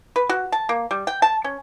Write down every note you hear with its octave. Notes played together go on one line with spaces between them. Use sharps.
B4
F#4
A5
A#3
G3
G5
A5
C#4